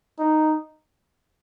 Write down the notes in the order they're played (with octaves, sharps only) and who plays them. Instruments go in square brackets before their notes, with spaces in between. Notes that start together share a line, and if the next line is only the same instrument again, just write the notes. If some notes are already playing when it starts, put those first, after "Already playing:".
[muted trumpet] D#4